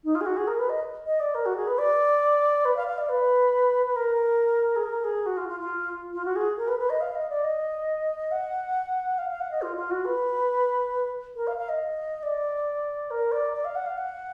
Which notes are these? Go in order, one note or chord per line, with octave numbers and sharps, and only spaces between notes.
D#4
F4
G#4
F#4
G#4
A#4
B4
D#5
D#5
D5
A#4
F#4
G#4
B4
D5
B4
F5
F5
D5
B4
B4
A#4
G#4
A#4
G#4
F#4
F4
F4
F4
F4
F#4
G#4
A#4
B4
B4
D#5
F5
D#5
D5
D#5
F#5
F5
F5
F#5
D#5
F4
F4
F#4
B4
A#4
F5
F5
D#5
D5
A#4
D5
D5
F5
F#5
F5
F#5